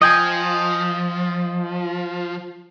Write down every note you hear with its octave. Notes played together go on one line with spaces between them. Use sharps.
F3 D#5 G5 G#5